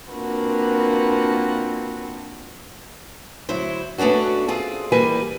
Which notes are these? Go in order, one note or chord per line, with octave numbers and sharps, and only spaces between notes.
A#3 C4 D4 F4 F#4 B4
D2 F#3 E4 C5
A3 B3 C#4 D4 F#4
C4 F4 G#4
E3 G3 A#3 B4 G#5